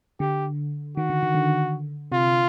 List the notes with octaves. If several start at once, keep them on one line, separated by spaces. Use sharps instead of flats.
D3 G4
D#3 F#4
D3
D#3
D3
C3 F4